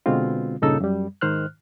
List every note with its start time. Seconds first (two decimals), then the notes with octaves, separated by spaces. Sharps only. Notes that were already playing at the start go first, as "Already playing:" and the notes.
0.06 B2 D3 G#3 C4 F4
0.62 G2 A#2 C#3 D#4 A4 E6
0.80 F#2 G3
1.21 G#2 D#3 C5 F6 F#6